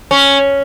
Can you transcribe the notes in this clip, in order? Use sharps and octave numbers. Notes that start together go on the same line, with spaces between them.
C#4